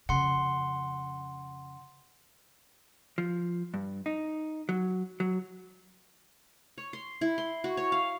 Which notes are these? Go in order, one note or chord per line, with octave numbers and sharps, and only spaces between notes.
F2 C#3 F#5 C6
F3
G2
D#4
F#3
F#3
C#5
C6
E4
C6
F#4
C#5
F5